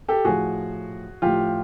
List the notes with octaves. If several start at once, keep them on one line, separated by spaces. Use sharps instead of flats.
G4 A4
A2 F3 F#4 G#4
A2 F3 F4 G4